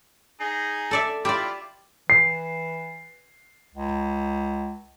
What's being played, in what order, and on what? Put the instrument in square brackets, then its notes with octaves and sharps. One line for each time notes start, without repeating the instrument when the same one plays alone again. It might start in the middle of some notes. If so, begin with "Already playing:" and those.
[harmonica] D#4 G#4
[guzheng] A4 D5 E5
[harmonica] E4 F4 [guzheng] G4 D5
[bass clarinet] E3 [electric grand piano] C7
[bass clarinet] C#2